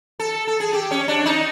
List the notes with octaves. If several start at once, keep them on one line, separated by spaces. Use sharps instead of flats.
A4
A4
G#4
G4
C#4
D4
D#4